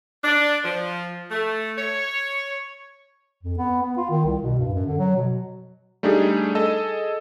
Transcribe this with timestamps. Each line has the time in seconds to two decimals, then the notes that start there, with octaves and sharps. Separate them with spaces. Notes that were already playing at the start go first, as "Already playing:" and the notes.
0.24 D4
0.65 F3
1.30 A3
1.77 C#5
3.43 F2
3.58 B3
3.83 B3
3.97 F4
4.10 D#3
4.26 C2
4.43 B2
4.59 G2
4.74 F#2
4.87 D3
4.99 F#3
5.16 B2
6.03 G3 A3 D4 D#4 G4 G#4
6.55 G#4 A4 D#5 A5 E6